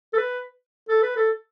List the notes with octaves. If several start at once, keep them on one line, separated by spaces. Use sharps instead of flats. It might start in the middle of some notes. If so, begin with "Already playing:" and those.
A4
B4
A4
B4
A4